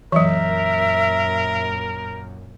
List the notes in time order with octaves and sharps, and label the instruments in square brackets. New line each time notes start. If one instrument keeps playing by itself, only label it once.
[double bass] F#2 A#2 [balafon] E3 F#3 [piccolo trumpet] A#4 [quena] E5